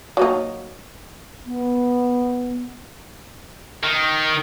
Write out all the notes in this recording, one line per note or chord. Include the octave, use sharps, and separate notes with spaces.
F#3 A#3 D#4
B3
D#3